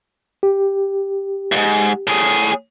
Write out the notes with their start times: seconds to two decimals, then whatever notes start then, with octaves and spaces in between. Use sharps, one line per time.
0.43 G4
1.52 E2 G#2
2.07 A2 G#4